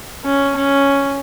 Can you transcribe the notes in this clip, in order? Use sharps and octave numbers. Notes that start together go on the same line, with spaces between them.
C#4
C#4